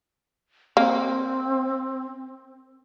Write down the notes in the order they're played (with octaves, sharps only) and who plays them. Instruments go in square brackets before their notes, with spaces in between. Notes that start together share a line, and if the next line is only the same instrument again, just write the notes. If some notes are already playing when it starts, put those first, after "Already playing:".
[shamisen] A#3 [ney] C4